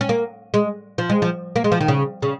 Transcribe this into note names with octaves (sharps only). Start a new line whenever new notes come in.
C#4
A#3
G#3
F3
G#3
F3
A#3
G#3
F3
D#3
C#3
C#3